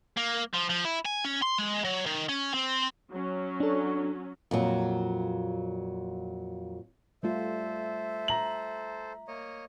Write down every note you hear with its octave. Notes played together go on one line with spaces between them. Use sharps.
A#3
F3
F3
E4
G#5
C#4
C6
G#3
F#3
D#3
C#4
C4
F#3 C#4
D4 A4
F2 A#2 F#3
G3 A3 F4 A4 C5 E5
A#5 F#7
A#3 C#5 D#5